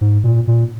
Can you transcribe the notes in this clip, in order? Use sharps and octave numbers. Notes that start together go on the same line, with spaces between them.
G#2
A#2
A#2